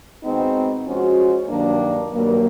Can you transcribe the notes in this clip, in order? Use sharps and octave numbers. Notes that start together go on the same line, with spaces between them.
B2 G#3 C4 D#4
F3 G#3 C#4 F#4
G2 D#3 F#3 A#3 D4
G2 D#3 F#3 A#3